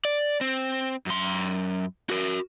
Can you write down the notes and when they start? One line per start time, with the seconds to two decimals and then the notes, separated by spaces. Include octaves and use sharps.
0.05 D5
0.41 C4
1.06 F#2 C6
2.10 F#4 A#4